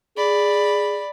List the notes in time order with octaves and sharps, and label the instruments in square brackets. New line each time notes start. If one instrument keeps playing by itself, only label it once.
[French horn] G#4 [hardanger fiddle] D5 B5